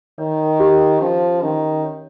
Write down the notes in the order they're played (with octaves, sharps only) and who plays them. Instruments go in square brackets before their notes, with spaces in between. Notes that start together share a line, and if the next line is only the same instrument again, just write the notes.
[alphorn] D#3 [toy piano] C#5
[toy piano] G4
[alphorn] F3 [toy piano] C#4
[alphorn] D#3 [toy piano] C#4
[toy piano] C#5